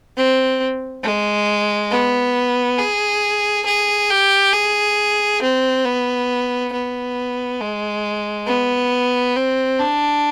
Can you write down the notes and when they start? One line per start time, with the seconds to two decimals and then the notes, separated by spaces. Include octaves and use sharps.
0.17 C4
1.04 G#3
1.91 B3
2.79 G#4
3.66 G#4
4.10 G4
4.54 G#4
5.42 C4
5.85 B3
6.73 B3
7.61 G#3
8.47 B3
9.36 C4
9.79 D4